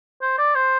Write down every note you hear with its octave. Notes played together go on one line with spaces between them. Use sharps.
C5
D5
C5